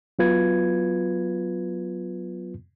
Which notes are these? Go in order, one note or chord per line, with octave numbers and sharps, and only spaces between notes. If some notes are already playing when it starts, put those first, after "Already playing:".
F#3 B3 F4 B4 G#6